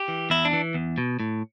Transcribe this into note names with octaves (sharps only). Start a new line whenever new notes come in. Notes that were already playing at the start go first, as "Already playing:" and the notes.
Already playing: G4
E3
E2 E4
D4
E3
E2
B2
A2